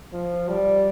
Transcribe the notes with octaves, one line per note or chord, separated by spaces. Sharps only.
F3
G3